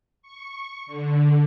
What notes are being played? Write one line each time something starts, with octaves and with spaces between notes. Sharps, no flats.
C#6
D3